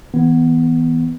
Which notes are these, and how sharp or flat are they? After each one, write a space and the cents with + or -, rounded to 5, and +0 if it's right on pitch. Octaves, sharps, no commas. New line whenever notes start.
E3 -30 B3 +0